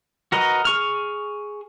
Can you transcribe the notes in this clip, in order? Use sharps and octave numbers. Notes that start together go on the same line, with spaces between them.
F#4 A#4 B4 D#5
G#4 C#6 F6